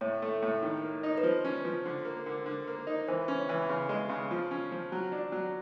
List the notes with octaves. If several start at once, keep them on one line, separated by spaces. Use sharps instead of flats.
A2 C#5
A3
A2
D#3
A#3
D#4
B4
F3 C5
C#4
F3
D3
A#3
D3
D3
A#3
D#4
E3 C5
C#4
C#5
E3
C#3
G#3
C#3
F3
C#4
F3
F#3
D4
F#3